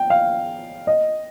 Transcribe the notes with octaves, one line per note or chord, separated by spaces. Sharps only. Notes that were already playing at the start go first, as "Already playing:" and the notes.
Already playing: G5
F5
D#5